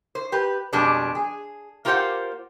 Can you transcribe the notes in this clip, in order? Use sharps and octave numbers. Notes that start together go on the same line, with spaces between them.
C5
G4 B4
F2 B2 G3 G#3 D4
G#4
A#3 F4 G4 A#4 C5 F#5